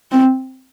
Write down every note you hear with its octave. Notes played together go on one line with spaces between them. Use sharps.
C4